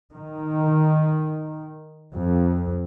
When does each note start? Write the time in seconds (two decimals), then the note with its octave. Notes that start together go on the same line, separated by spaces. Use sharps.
0.15 D#3
2.16 F2